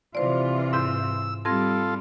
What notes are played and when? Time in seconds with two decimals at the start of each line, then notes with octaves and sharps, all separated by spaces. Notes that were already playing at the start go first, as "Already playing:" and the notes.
0.15 C3 E3 F4 C5 D5
0.73 G#2 E6 G6
1.45 G3 C4 F4 A4 G#6 A#6